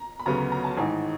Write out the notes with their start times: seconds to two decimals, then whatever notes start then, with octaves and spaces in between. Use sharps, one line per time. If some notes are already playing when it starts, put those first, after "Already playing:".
Already playing: A#5
0.20 B5
0.26 D2 C#3 F#3 B3 A#5
0.52 A#5
0.64 A5
0.77 A1 G#2 D#3 G#5